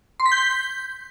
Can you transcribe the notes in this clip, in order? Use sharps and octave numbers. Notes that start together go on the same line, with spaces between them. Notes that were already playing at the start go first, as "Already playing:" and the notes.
C6
B6
G6